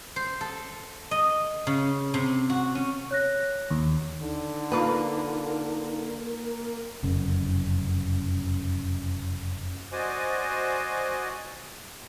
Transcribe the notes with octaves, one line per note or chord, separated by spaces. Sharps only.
C5
A4
D#5
C#3
C3
F#4
C#4
C#5 F#6 A#6
D#2
D3 D#4
A#3 F4 B4
F1 F#2 C#3
F#4 C5 D5 D#5 G#5